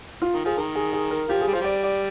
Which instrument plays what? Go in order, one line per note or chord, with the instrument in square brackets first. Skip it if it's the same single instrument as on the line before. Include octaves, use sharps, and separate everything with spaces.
[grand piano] F4
[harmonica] D#3
[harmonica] F3 [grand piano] G#4
[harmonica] D#3 [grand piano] A#4
[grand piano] G#4
G#4
A#4
[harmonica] F3 [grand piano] G4
[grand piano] G#4
[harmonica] G3
[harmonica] F3 [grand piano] C5
[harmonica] G3 [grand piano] D5
[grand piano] D5